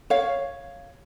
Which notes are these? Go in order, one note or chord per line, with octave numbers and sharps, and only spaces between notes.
C#5 F5